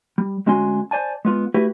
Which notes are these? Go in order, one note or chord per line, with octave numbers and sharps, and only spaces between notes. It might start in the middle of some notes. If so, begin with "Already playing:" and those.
G3
D2 G#3 C#4 F#4 G#5 C6
C5 D5 G#5 A5
G#3 B3 F4
A3 E4 F#4 G4 B4